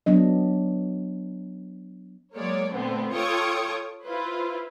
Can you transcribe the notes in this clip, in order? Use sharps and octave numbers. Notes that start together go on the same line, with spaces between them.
F#3 B3 D4 D#5
F#3 G#3 A#3 C#5 D5
A#2 D3 A3 B3 C4
F4 A4 C#5 G5 C#6 D#6
E4 F4 B4 C5